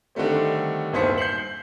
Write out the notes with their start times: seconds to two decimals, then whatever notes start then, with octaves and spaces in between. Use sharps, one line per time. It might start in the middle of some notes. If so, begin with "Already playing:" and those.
0.15 D3 D#3 G3 A3 C4
0.93 D1 G1 D#2 C5 B6 C#7
1.18 G6 C7 C#7 F#7